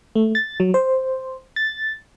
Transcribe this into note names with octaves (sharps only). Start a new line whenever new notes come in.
A3
A6
F#3
C5
A6